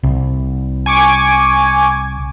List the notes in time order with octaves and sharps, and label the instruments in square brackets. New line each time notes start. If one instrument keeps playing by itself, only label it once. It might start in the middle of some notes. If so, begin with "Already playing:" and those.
[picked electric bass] C2
[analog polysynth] G#5 C#6 D6